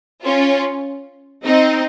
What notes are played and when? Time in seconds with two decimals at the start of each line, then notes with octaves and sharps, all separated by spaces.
0.24 C#4 F4
1.45 C4 D#4